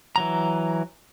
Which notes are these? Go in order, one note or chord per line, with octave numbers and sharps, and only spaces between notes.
E3 F#3 A#5